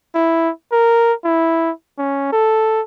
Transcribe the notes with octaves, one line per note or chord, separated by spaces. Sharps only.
E4
A#4
E4
C#4
A4